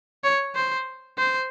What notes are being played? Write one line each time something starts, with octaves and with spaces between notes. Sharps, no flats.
C#5
C5
C5